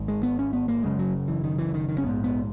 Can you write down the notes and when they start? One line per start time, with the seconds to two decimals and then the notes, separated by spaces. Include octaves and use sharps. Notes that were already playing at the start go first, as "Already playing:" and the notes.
Already playing: G#1 G#2
0.08 G#3
0.23 B3
0.39 C#4
0.53 B3
0.68 A#3
0.83 F#1 F#2 C#3 G#3
0.99 F#3
1.28 E3
1.44 D#3
1.58 E3
1.74 D#3
1.89 D#3
1.98 C#4
2.04 A#1 G#2 B3
2.24 B3